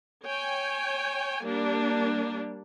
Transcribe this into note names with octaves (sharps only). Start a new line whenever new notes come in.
C#5 G5 G#5
G3 A#3 D4